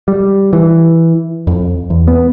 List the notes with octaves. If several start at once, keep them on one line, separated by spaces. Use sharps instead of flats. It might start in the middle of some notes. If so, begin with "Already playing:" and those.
G3
E3
F2
E2
B3